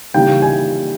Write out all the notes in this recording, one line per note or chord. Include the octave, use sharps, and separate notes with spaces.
C#3 E3 G3 A#3 D#4 G5
G#5